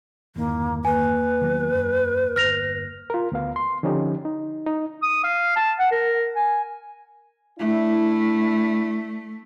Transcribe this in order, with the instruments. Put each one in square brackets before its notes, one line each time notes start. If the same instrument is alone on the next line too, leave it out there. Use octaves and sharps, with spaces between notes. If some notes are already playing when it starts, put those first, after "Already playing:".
[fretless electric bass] G1 D#3 [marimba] E2 [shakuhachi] A#3
[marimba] A#3 [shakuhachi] B4 [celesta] G#5
[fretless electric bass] D#3 F#3 B3
F#2
[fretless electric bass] G1 [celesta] F6 A#6 F7
[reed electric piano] F4 A#4
D2 B3 F5
C6
D3 F3 C#4 D#4 G4
D#4
D#4
[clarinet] D#6
F5
A5
F#5
A#4
G#5
[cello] A3 [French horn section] D4 E4